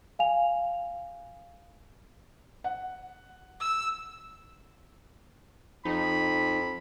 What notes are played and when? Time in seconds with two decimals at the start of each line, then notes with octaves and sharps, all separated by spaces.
0.19 F5 G#5 F7
2.64 F#5
3.61 E6
5.85 F2 D#4 B5